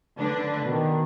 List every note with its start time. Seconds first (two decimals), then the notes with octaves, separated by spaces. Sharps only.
0.18 D3 D4 B4
0.65 B2 D#3